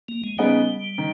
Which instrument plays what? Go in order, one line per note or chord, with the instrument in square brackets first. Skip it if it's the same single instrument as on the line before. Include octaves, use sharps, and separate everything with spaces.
[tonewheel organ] A#3
G#3
[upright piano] C#3 G#3 B3 D#4 [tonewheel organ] G3
[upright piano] D#3